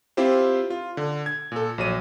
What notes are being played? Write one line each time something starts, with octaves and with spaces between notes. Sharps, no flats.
C4 E4 F4 G4 C5
F4
D3
G#6
A#2 A4
A#1 F#3 D#7